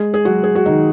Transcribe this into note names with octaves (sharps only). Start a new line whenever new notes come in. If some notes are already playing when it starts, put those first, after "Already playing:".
Already playing: G#3 G#4
G#4
F#3 F#4
G#4
F#4
D#3 D#4